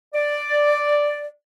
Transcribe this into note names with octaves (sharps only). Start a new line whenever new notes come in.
D5